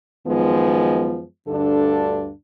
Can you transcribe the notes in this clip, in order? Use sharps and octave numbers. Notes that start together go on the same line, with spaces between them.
F#2 D#3 F3 G#3 B3
D2 G2 D3 D4 A4